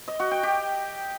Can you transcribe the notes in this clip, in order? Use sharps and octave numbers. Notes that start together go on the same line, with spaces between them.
D#5
F#4
G5
G4